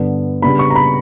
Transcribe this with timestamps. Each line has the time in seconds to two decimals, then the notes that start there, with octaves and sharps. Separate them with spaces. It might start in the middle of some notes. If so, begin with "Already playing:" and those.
Already playing: G2 D3 G3 B3
0.42 C#3 G3 B3 D4 B5
0.59 C#6
0.70 A#5
0.76 B5